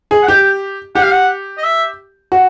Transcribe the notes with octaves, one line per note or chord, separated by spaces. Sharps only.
G#4
F#5
G4 G5
G4 F#5
F5
F#5
D#5
E5
F#4